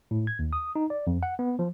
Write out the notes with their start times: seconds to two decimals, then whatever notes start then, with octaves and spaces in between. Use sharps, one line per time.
0.11 A2
0.27 G#6
0.39 D#2
0.53 D#6
0.76 D#4
0.90 D5
1.07 F2
1.23 F#5
1.39 B3
1.59 F3